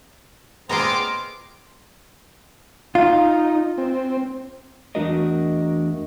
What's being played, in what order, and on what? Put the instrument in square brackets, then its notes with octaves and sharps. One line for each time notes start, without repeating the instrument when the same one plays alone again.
[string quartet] A#2 D6 F6 [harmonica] G#3 B3 C4 [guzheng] A#5 C6
[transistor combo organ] D#4 [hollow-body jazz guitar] F4
[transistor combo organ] C4
[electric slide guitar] E2 A3 D4 F#4 A#4 D#5